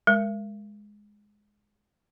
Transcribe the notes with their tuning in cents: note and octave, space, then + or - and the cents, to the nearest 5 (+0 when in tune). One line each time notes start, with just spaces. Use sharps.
G#3 +0 A#4 +0